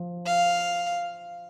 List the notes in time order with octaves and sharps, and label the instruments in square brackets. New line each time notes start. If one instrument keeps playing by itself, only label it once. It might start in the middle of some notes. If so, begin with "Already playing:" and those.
Already playing: [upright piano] F3
[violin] F5